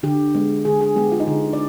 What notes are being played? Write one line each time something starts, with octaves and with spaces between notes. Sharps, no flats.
D3 G4
G#3 B3
D3 G#4
G#4
G#3 B3 G4
F4
D#4
D3 D4
D5